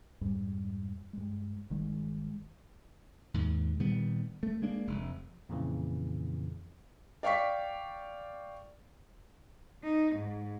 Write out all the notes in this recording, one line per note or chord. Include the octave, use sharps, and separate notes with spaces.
F2 G#2 G3
G2 G#3
G1 D#3 G#3
D#2 G#2
A#2 D#3 G3 B3
A3
G#3 A#3 D4
F1
F2 A#2 C#3 E3
D5 F5 G5 C#6 B6
D#4
G#2